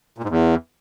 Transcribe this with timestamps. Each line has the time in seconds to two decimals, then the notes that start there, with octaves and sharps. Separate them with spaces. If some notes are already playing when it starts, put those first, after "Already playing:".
0.18 A#2
0.24 G#2
0.29 E2